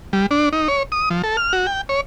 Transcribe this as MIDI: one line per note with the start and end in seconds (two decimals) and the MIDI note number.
0.13 0.26 55
0.31 0.49 62
0.53 0.68 63
0.68 0.83 73
0.92 1.09 87
1.10 1.22 53
1.24 1.37 69
1.37 1.53 89
1.53 1.67 66
1.67 1.81 79
1.89 2.01 73